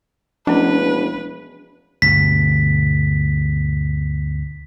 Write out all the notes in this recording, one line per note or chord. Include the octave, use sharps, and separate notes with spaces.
E1 F3 A3 C#4 D4 B4
D2 G2 B2 B6